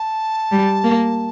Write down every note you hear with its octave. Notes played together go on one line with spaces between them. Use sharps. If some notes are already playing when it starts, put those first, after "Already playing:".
Already playing: A5
G3
A#3